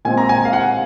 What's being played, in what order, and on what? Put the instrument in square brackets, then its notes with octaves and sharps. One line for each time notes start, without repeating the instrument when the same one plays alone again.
[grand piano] A#2 G#3 C4 G#5
A#5
G#5
F5
F#5